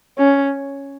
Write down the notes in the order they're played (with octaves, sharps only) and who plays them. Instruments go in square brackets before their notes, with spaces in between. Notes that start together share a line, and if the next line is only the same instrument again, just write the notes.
[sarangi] C#4